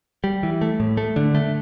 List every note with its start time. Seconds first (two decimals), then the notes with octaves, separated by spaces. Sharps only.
0.24 G3
0.43 E3
0.61 A3
0.80 A2
0.97 A3
1.16 D3
1.35 A3